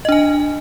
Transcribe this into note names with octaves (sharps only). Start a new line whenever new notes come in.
D4 D#5 G#5